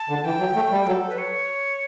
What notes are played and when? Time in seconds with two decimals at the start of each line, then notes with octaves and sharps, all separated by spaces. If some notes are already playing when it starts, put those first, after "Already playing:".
Already playing: A5
0.09 D3
0.25 E3 G5
0.40 F#3
0.56 A3
0.72 G3
0.87 F#3 A4
1.10 B4
1.18 C#5